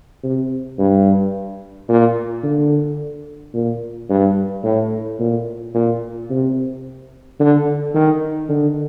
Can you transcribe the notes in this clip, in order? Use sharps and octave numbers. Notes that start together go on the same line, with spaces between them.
C3
G2
A#2
D3
A#2
G2
A2
A#2
A#2
C3
D3
D#3
D3